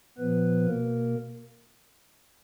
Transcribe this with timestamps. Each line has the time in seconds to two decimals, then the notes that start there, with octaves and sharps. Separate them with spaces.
0.18 A#2 F3 B3 B4
0.67 B2 A#3 A#4